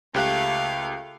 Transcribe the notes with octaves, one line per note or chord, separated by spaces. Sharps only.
C#2 A3 G4 F5 F#6